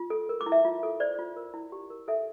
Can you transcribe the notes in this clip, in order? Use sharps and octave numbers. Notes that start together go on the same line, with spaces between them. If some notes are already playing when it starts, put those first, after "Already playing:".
Already playing: F4
A4
A#4
D6
E4
E5
F4
A4
C5 D5
F4
A#4
E4
G4
A#4
A4 E5